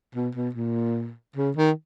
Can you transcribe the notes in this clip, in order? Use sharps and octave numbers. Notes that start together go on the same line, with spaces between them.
B2
B2
A#2
C#3
D#3